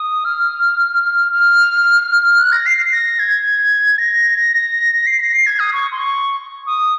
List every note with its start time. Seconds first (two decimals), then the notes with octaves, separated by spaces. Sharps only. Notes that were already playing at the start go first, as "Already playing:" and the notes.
Already playing: D#6
0.25 F6
1.32 F6
2.38 F#6
2.52 A#6
2.66 C7
2.92 A#6
3.19 G#6
3.98 A#6
5.06 C7
5.20 A#6
5.33 C7
5.46 G#6
5.60 D#6
5.73 C#6
5.92 C6
5.99 C#6
6.67 D#6